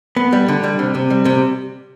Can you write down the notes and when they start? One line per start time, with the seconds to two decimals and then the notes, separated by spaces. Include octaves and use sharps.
0.16 B3
0.33 G3
0.48 D3
0.64 G3
0.79 C3
0.95 C3
1.10 G3
1.25 C3